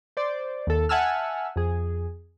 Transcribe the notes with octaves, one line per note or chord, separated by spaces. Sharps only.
C5 D5
D#2 A4
E5 F#5 G#5 A5 E6 F6
F2 G#4